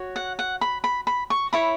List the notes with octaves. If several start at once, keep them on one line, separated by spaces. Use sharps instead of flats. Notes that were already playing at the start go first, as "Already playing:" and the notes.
Already playing: F#4 C#5
F#5
F#5
B5
B5
B5
C#6
E4 C#5 B5